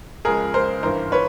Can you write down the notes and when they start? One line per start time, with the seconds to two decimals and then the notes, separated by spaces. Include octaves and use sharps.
0.25 C#2 C#3 F3 G#3 G#4 A#4
0.54 A#4 C5
0.83 G#1 G2 E3 A#4 C5
1.12 B4 C#5